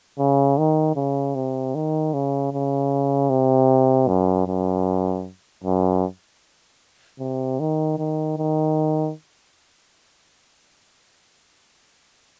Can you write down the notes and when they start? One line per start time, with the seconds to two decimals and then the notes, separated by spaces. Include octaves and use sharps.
0.19 C#3
0.58 D#3
0.96 C#3
1.35 C3
1.75 D#3
2.14 C#3
2.53 C#3
3.30 C3
4.08 F#2
4.47 F#2
5.64 F#2
7.19 C3
7.60 D#3
7.98 D#3
8.38 D#3